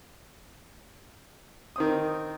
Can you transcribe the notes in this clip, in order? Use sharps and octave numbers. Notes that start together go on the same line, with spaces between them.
D#3 C4 D#6